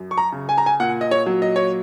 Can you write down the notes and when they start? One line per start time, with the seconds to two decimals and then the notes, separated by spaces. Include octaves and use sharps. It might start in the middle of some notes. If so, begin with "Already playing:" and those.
Already playing: F#2
0.11 C#6
0.18 A#5
0.32 C#3
0.49 G#5
0.58 A#5
0.66 G#5
0.80 A#2 F#5
1.01 D#5
1.11 C#5
1.26 F#3
1.42 D#5
1.56 C#5